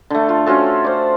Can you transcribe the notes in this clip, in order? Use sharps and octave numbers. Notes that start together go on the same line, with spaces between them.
D3 A3
F4
C#4 F4 F#4 A4
C5 D5